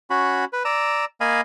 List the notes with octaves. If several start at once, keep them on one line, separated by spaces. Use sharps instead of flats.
C#4 F#4 B5
B4
D5 A#5 E6
A#3 D#5 F5 G#5 B5